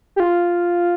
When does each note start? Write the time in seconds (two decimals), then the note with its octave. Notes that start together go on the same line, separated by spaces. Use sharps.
0.16 G4
0.20 F4